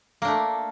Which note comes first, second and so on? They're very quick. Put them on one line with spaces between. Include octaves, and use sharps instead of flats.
A#3 D4 A3